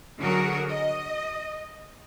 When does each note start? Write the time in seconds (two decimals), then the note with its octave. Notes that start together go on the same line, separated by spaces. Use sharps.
0.18 D3 F#3 F#4 G#4 A#4
0.69 D#5